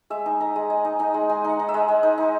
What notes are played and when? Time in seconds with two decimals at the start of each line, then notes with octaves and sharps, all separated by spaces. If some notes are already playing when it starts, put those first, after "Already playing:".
0.10 G#3 E5
0.26 D#4
0.40 D#4 A#5
0.56 G#3
0.70 G#3 G#5
0.85 D#4
0.99 D#4 A#5
1.14 G#3
1.29 G#3 G#5
1.44 D#4 F#5
1.59 D#4
1.69 E5
1.74 G#3
1.88 G#3
2.03 D#4
2.18 D#4